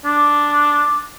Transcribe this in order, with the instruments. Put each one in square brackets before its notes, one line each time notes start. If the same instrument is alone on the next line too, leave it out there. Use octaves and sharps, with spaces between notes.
[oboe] D4 [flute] D6